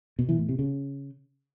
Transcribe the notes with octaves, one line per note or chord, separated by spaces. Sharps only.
B2
E3
A2
C3
C#3